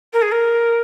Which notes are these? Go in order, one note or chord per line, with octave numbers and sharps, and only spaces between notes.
A#4
G#4
A#4